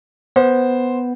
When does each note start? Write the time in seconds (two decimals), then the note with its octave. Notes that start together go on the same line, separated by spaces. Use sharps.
0.36 B3 C5